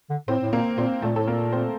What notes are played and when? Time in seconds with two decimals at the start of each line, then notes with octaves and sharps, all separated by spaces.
0.10 D3
0.28 A2 C4 C5
0.42 A2
0.53 A#2 A#3 A#4
0.78 A#2 C4 C5
1.02 A#2 A3 A4
1.16 A2 A4
1.27 A#2 A#3 A#4
1.53 C4 C5